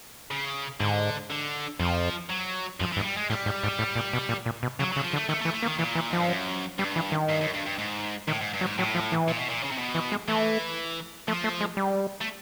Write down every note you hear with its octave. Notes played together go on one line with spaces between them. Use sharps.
C#3
G#2 D3
D3
F2 F3
F#3
F#2 F3
E3
G2
G#3
G3
G#3
A2 G3
G#2
G#2
A2
A#2
B2
A#2
A#2
B2
C#3 F#3
F#3
C#3
F3
D3
A3
D#3 A3
E3 A3
A3
A#3
D#3
A#2 E3
E3
G#2 F3
G2
F#2
G2 G3
E3
D#3
G2
F#2
G2
G2
G#2
A2 D#3
G#2
G2
F#3
G#2
A2 F#3
F3
E3
A#2
B2
A#2
C#3
C3
B2
E3
G#3
E3 A3
F3 A3
A3
G#3
G3
A3